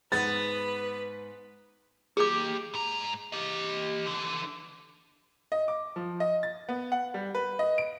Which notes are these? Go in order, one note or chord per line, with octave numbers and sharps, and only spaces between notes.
G#2 B3 B4 A6
A#3 G4 G#4 D6
G#2 A#5
G4 D#5
D3 E3
D#5
D6
F3
D#5
A6
B3
F#5
G3
B4
D#5
D7